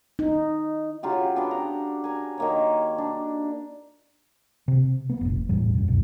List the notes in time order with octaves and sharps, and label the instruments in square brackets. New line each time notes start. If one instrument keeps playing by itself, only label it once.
[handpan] D#4
[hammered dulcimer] C#3 F#3 F4 G4
B3 D4 F#4 G5
A#5
A#4 G#5
D#3 A#3 C#5
D4
[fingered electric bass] C3
A3 B3
F1 A#1
A#1 E2 A2 G3
F#2 B2
C#2 F#2 F#3